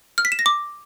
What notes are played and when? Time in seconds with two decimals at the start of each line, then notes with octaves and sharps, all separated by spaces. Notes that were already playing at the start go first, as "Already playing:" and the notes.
0.18 F6
0.25 B6
0.32 E7
0.39 A#6
0.46 D6